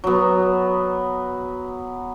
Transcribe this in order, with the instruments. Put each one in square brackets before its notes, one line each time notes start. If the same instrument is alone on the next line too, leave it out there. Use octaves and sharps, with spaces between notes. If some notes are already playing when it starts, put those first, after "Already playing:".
[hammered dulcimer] F#3 B3